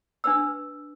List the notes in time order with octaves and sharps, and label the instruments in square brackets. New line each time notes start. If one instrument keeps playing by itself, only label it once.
[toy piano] D4 B4 E6